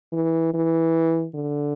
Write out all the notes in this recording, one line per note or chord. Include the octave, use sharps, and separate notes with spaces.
E3
E3
D3